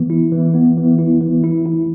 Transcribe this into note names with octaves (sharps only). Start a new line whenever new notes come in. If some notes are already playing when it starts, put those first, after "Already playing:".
Already playing: E3 B3
E4
E3
B3
E3
E4
E3
E4
E4